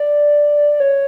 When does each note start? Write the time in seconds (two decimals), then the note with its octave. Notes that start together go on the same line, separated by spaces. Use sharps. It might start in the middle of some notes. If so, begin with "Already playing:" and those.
Already playing: D5
0.80 C#5